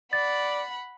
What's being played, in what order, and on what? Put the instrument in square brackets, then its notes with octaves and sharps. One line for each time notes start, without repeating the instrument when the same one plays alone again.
[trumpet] D5 [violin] F#5 B5 [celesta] A6